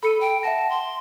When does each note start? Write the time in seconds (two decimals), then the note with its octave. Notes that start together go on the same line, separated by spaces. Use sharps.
0.03 A4 B5 C#7 D#7
0.21 G5
0.43 E5 F#5 A5 A#6
0.70 C6